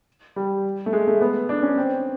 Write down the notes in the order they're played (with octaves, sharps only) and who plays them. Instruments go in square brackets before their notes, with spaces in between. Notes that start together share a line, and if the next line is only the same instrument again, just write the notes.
[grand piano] G3
A3
G#3
A3
B3
D4
C#4
C4